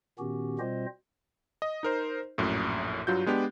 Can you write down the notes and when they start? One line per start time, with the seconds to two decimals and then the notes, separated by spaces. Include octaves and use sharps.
0.19 A#2 D#3 B3 C#4 F#4 G4
0.59 B2 G3 C4 F4 C5 D#5
1.62 D#5
1.83 D#4 A#4 C5
2.38 A#1 F#2 A2
3.07 G2 F#3 F4 F#4 G6
3.26 G#3 B3 D4 G4